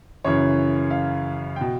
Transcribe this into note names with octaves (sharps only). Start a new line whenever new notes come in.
F#2 C#3 E3 C#5
F5
B2 G5